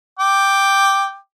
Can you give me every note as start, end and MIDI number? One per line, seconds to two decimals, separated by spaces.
0.19 1.16 79
0.19 1.16 86